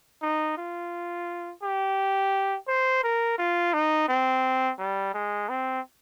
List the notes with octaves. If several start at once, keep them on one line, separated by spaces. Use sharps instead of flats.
D#4
F4
G4
C5
A#4
F4
D#4
C4
G3
G#3
C4